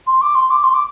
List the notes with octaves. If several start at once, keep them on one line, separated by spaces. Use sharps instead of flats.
C6
D6
C6
D6
C6
D6